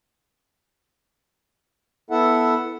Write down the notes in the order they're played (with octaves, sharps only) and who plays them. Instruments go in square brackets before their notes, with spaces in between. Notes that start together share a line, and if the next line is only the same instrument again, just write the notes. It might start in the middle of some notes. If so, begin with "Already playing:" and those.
[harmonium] B3 E4 A4 E5 F#5